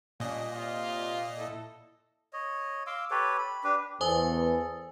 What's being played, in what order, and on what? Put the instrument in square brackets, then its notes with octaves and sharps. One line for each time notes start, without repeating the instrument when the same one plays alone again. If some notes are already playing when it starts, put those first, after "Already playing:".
[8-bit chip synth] A#2 D#5 [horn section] G3 C#4 D4
[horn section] C3 F4
E4 A4
[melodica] C#5 D#5
F5 C6 D6 E6
G4 A4 B4 C#5
B5
D4 G4 B4
[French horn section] E2 [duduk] A4 [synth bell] C5 G#5 D#6